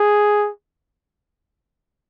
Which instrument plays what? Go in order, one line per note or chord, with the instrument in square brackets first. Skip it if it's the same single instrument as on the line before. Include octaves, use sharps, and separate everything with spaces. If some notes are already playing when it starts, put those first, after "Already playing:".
Already playing: [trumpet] G#4